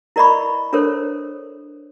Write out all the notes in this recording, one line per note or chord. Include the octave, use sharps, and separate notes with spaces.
E4 A#4 D5 D#5 B5 C#6
D4 A4 A#4 C5 C#5